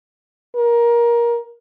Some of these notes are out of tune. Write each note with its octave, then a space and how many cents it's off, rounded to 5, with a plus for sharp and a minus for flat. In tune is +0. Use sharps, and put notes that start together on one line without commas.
A#4 +20